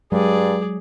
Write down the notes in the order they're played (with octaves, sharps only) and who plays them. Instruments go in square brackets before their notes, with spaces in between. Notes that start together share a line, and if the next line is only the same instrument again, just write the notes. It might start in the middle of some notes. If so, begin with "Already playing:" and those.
[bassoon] G2 [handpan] F#3 G#3 [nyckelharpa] G#4 D5